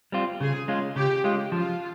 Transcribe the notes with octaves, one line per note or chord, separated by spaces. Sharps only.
G3 C4 F4
C#3 G#4
G#3 C#4 F4
C#3 G4
G#3 C#4 F4
F3 F4